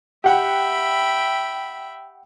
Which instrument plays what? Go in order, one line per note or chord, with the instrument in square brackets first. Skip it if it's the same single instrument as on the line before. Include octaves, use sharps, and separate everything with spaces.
[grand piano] G4 F#5 [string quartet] E5 G5 B5